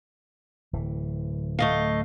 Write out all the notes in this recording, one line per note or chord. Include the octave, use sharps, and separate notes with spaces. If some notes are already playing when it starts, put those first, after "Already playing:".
D1 E3
A3 D#5 F5